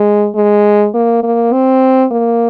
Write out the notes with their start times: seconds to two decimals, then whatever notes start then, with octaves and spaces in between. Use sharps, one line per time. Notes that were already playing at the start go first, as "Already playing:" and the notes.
Already playing: G#3
0.35 G#3
0.94 A#3
1.23 A#3
1.53 C4
2.11 A#3